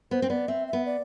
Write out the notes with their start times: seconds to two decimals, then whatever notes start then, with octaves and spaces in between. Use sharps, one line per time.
0.11 B3 C5
0.22 C4
0.30 B3 D5
0.48 C4 E5
0.68 E5
0.73 B3
0.86 D5